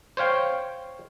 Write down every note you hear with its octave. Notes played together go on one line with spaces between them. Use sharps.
C5 C#5 F5 G5